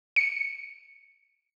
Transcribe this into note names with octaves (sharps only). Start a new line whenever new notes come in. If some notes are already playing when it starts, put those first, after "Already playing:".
C#7